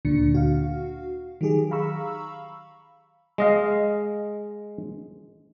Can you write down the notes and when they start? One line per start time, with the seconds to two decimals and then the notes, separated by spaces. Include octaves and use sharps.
0.05 D2 A#2 D3 D4 C#7
0.34 F#4 F5
1.41 D#3 F#3 G4 G#4
1.71 F5 A#5 B5 C#6 E6
3.38 G#3 D#5 F5